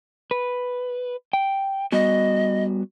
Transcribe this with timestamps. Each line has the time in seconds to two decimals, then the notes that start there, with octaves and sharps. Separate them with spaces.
0.31 B4
1.33 G5
1.92 G3 B3 F#4 D#5